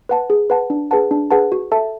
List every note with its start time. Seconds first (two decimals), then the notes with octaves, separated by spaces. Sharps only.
0.09 B4 F#5 A5
0.30 G#4
0.50 B4 F#5 A5
0.70 D4
0.91 G#4 B4 F#5 A5
1.11 D4
1.31 G#4 B4 F#5 A5
1.52 F#4
1.72 A4 E5 A5